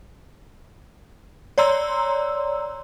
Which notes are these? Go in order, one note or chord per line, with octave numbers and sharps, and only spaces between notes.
C#5 D5 A#5 C6 E6